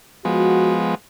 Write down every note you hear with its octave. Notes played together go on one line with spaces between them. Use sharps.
F3 G#3 B3 F#4